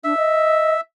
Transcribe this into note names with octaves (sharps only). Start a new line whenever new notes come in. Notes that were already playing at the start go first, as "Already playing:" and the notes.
D4 E5
D#5